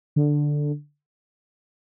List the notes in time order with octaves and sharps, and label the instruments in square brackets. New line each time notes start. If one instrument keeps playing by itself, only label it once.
[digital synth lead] D3